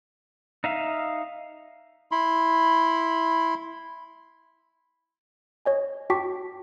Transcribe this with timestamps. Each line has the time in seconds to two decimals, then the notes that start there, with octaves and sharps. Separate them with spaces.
0.64 D#4 E5 F5
2.11 E4 B5 C6
5.65 C#5 D#5 G#5
6.10 F#4 G5 A5 C#6 D6 B6